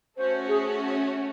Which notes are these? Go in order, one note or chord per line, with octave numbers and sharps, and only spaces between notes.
A3 C#4 F#4 C5
G#4